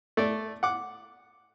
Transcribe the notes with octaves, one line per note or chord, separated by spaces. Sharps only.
A3 D5
F#5 D6